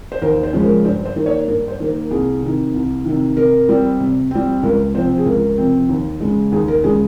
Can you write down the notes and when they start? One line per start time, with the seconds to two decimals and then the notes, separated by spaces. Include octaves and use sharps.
0.12 C5
0.22 D#2 A#4
0.43 C5
0.53 C#3 F3 G#3 C#4
0.64 A#4
0.85 G2 C5
1.05 C5
1.16 D#3 A#3
1.26 C#5
1.48 G2 A#4
1.68 C5
1.80 D#3 A#3
1.90 A#4
2.11 C2 G#4
2.43 C3 D#3
2.74 C2
3.05 C3 D#3
3.37 C3 A#4
3.69 G3 C4
4.00 C3
4.31 G3 C4
4.63 C#2 A#4
4.95 C3 F3 C4 C5
5.18 G#4
5.26 C#2 A#4
5.58 C3 F3 C4
5.89 D#2
6.20 C#3 G#3
6.52 D#2 G#4
6.68 A#4
6.84 C#3 G#3 G#4